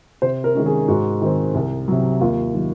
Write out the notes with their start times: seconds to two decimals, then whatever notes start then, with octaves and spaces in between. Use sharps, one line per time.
0.22 C3 C5
0.44 A#4
0.55 D#3 G#3 C#4
0.66 G#4
0.88 G#2 F#4
1.22 D#3 G#3 C4
1.54 C2
1.88 C3 F#3
2.21 D#2 F4
2.54 D#3 F#3